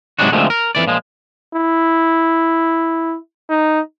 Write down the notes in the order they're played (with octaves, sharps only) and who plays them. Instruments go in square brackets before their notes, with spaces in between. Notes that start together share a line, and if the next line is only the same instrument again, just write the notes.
[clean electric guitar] G#2 C3 F#3 G#3 D4 F#4
D2 A#2 F3 G#3 A3 C4
A#4
F2 E3 D5
A#2 F3 G#3
[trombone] E4
D#4